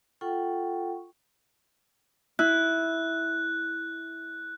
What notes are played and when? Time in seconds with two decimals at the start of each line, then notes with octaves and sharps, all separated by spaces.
0.21 F4 A4 F#5 G5 C#6
2.39 E4 F#6